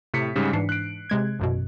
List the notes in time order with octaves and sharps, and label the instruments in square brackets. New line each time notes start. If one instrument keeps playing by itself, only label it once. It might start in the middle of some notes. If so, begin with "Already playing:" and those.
[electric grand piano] A2 B6 C#7 [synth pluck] C3
[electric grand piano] G#2 C#3 G3
[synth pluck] G#2 E3 D4 [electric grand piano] C7
[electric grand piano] F#6 D7
[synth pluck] C3 G#3 G#6
A1 F#2 B2